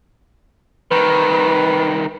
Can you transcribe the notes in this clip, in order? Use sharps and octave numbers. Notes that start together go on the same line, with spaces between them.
C2 D#3 B4